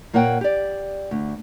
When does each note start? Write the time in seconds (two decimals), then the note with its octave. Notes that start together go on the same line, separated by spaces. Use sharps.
0.13 A#2 A#3 A#4 C#5 F#5 G5
0.41 G4 D5
1.11 D2